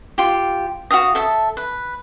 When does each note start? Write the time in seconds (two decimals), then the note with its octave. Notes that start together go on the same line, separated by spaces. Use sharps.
0.18 F4 G4
0.91 F#4 E5 F5 D#6
1.15 A4 E5 A5
1.57 B4